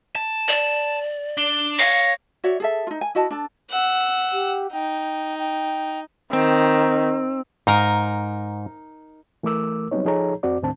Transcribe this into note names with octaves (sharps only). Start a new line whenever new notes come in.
A5
D5
D4 G7
C#5 F5 A#6
F#4 C#5 D5 E5
G#4 A4 E5
D#4 F4
G#5
E4 F#4 D#5 A5
D4 A4
F#5 E6
G4
D#4 G5
G5
D#3 C4
G#2 D#4 A#4 F5
E3 A3 A#4 D6 E6
F#3 G3 B3 C4 D#4 C#5
F3 D#4 G#4 A4 C#5 A#5
F2 C4 F#4 D5 D6
D#2 A2 D#3 C4 D4 A5